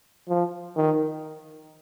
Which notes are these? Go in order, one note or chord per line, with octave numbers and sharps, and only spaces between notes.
F3
D#3